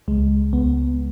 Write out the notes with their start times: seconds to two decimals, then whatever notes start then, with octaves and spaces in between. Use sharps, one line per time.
0.08 C#2 G#3
0.53 C#2 B3